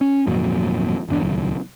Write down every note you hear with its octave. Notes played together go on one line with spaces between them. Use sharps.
C#4
G#1 F2 A#2 F#3
G1 E2 D4
D#1 C#2 F#3